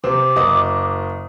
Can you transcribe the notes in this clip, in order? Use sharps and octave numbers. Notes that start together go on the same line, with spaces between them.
C3 C4 D6
F#1 D#5 D#6